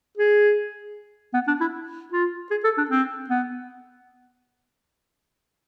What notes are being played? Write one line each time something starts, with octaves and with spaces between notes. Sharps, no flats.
G#4
B3
D4
E4
F4
G#4
A4
D4
C4
B3